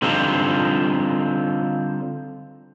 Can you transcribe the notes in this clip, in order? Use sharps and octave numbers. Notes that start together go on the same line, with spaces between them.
D3 G3 C4 D#4 F4 A4